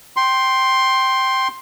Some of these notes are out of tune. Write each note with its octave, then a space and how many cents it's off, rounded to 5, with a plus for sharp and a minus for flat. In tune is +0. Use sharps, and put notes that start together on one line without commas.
G5 -10 C6 +10